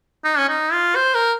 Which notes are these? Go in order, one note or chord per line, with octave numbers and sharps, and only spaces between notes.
D#4
C#4
D#4
F4
C5
A#4